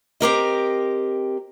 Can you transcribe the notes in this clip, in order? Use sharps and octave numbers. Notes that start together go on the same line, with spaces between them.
C4 G4 A#4 D#5